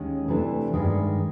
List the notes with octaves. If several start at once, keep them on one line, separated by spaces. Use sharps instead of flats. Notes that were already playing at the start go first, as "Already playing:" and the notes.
Already playing: D#2 D#3 G#3 C#4
C3 E3 A3 D4
G2 D#3 G#3